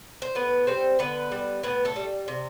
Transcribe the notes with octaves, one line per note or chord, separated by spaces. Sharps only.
C5
A2 B3 B4
G3 C4 C5
D3 B3 B4
G3
A2 B3 B4
A3 A4
G3
C3